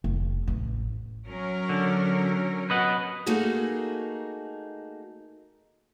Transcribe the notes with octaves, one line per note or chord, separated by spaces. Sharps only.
F1
A1
F#3 C#4 A#4
D3
B4 D#5 F#5
A3 A#3 D#4 F#4 G#4